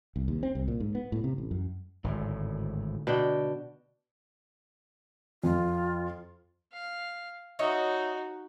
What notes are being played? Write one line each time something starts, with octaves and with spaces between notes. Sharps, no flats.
C2
D#2
C4
C2
A#2
G#2
B3
A2
C3
A1
F#2
G#1 D2 A2
B2 D4 G5
F2 F4
F5
D#4 F#4 C#5 D#5 E5